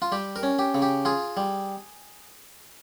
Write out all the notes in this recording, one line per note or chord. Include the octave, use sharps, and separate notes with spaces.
F4
G3 G4
A#4
C#4
G4
C#3
G4
F4 G#4
G3